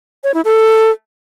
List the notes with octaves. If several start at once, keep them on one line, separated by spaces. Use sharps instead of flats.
C#5
E4
A4